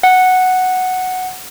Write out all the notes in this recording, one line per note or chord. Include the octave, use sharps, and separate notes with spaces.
F#5